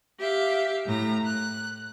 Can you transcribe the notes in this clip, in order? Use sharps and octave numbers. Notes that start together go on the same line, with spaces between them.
G4 E5 F5
A2 A#5
F#6